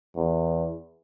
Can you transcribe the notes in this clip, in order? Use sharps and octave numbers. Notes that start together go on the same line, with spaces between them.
E2